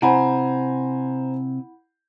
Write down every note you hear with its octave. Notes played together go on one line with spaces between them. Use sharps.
C3 E4 C5 F#5 G#5 A#5 B5